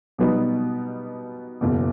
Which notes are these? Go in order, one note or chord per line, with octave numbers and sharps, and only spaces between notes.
B2 G3 B3 D#4
F#1 E2 B2